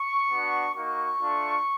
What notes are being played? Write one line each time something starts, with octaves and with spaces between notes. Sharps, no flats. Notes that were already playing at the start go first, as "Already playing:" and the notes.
Already playing: C#6
B3 D4 F#4
A#3 D#4 F#4 C#6
A3 D4 F4